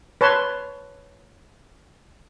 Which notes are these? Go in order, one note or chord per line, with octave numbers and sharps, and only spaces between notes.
B4 C#5 A5 C6